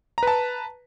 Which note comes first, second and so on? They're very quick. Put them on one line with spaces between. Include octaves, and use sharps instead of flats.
A#5 B4 A5